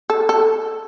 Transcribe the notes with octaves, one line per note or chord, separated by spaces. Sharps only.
A4
A4